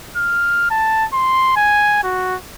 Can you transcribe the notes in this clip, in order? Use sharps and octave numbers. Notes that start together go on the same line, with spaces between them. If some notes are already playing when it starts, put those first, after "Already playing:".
F6
A5
C6
G#5
F#4